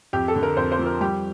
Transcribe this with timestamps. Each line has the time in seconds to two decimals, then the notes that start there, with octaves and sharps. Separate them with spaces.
0.13 F2 G4
0.28 A4
0.35 D3
0.43 A#4
0.57 F2 C5
0.72 C5
0.79 F3
0.86 A#4
1.01 G3 G4